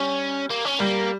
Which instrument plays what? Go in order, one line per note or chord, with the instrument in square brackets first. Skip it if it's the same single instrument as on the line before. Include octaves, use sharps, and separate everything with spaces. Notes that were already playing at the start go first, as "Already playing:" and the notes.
Already playing: [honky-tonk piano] G3 [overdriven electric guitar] C#4
[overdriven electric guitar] A#3
C#4
[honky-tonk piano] G3 [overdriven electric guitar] A#3